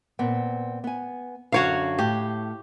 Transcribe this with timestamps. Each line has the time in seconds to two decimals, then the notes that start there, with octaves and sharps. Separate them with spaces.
0.19 A#2 B3 C4
0.84 B3 G#5
1.52 F#2 D3 F#4 C#5 F5
1.99 A2 G4